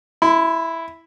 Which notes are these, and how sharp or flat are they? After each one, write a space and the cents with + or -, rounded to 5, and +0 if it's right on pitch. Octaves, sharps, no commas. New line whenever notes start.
E4 +0 C6 -40